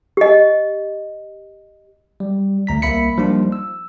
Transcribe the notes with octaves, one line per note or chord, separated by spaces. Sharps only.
G4 D#5
G3
D2 A#5 B6
C2 A#3 E5 B5 B6 C#7
F3 G3 A#3 D4 D#4 F4
E6